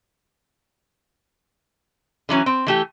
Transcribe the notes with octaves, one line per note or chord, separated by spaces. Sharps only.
D3 E3 F#3 C#4
C4
E3 A3 G4